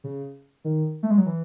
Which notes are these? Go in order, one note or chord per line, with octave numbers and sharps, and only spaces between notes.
C#3
D#3
A3
G#3
F#3
E3